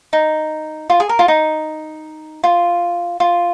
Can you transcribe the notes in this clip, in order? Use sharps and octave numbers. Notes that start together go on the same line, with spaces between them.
D#4
F4
G#4
A#4
F4
D#4
F4
F4